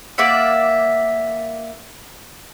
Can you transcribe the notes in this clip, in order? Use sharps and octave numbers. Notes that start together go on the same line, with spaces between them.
A#3 D5 E5 F#5